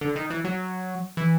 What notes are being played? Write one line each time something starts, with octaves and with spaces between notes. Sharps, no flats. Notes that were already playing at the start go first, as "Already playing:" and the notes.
D3
D#3
E3
F#3
E3